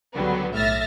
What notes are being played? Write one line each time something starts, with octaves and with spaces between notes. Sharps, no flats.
C#2 D3 F#3 G3 B3
B1 A2 E5 F6 A6 A#6